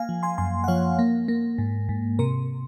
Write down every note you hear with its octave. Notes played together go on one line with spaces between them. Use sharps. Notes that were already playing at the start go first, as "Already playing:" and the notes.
Already playing: A#3 F5 G#5
F3
G#5 C6
F#2 G#5 C6
F#5
F3 C#5 F5
A#3
A#3
G#2
G#2
C3 A#4